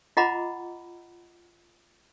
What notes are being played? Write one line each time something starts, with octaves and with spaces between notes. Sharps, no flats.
F4 D#5 F#5 A#5 B5 D6